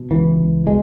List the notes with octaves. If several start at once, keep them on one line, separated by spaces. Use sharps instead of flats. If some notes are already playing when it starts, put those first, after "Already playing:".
Already playing: B2
C#2 E3
C#2
B2 G#3